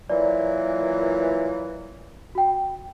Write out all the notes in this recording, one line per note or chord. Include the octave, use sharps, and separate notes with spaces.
A#2 E3 F#3 D5
F#4 G5